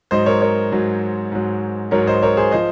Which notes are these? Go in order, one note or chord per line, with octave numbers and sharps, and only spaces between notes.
G#2 F#3 C5 D#5
A#4 C#5
A#4 C#5
G#2 F#3
G#2 F#3
G#2 F#3 A#4 C#5
C5 D#5
A#4 C#5
G#4 C5
F3 C5 D#5